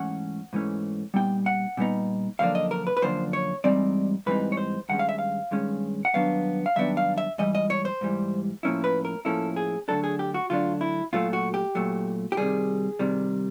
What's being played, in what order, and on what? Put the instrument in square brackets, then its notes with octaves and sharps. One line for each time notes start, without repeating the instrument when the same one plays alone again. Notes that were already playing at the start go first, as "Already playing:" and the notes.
Already playing: [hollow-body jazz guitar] G#2 E3 A3 C#4 F#5
G#2 E3 A3 C#4
A#2 G3 B3 D#4 G5
F#5
A#2 G3 B3 D#4
F#2 D3 F3 A#3 D4 F5
D#5
A#4
B4
B4
F#2 D3 F3 A#3 D4 C5
C#5
G#2 E3 G3 C4 D#4 D5
G#2 E3 G3 C4 D#4 B4
C#5
C5
G2 D#3 G#3 C#4 F#5
F5
E5
F5
G2 D#3 G#3 C#4
F#5
G2 D#3 F#3 B3 D4 F5
F5
G2 D#3 F#3 B3 D4 E5
F5
E5
G#2 E3 G3 D#5
D#5
C#5
C5
G#2 E3 G3
A2 F3 A#3 C#4 E4
B4
A#4
A2 F3 A#3 C#4 E4 A4
G#4
D3 F#3 A3 D4 A4
G#4
G4
F#4
D3 F#3 A3 D4 F4
E4
A#2 F#3 A3 F4
F#4
G4
A#2 F#3 A3
G4
C3 D#3 G3 G#4
C3 D#3 G3